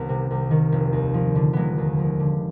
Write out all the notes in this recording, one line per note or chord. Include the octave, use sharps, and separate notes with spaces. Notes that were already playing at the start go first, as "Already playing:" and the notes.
Already playing: C2 D#3 B3
C3
C2
D#3
F1
D#2
F3
D3
F1 G#3 B3
D#2
F3
D3